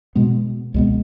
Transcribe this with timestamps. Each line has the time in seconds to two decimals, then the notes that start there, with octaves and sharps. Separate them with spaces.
0.15 B2 G#3 B3
0.74 C#2 B2 G#3 B3